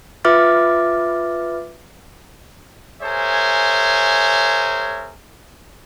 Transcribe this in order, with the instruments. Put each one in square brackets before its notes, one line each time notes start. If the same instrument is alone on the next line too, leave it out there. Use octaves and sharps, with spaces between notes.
[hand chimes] F4 B4 E5 D6 F6 A6
[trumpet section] G#4 A#4 C5 C#5 E5 G#5